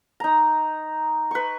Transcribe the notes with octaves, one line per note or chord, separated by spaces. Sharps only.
D#4 A#5
B4 C#6